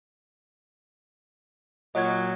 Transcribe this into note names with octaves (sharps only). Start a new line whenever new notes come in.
A#2 F#3 D#5 G#6